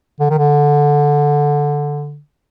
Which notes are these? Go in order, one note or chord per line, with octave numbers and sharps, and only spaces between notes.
D3
D#3
D3